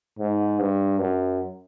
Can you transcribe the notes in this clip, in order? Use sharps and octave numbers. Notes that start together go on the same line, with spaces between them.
G#2
G2
F#2